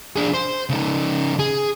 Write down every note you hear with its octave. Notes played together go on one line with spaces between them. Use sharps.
D4 G#4
C5
C#3 D#4
G#4